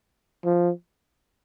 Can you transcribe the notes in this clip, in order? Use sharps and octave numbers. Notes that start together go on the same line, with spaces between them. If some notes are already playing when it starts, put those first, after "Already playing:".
F3